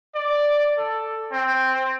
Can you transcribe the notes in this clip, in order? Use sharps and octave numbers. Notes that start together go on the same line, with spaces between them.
D5
A4
C4